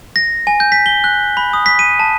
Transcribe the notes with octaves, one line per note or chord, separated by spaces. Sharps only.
A#6
G#5
G6
B6
G7
F#6
B5
D#6
B6
D#7
A5